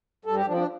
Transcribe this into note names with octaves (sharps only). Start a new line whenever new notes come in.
G2 A4
G4
F3 D4
C4
D4